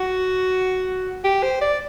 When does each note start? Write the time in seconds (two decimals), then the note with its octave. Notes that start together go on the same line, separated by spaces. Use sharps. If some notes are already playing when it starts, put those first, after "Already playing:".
Already playing: F#4
1.24 G4
1.43 C5
1.61 D5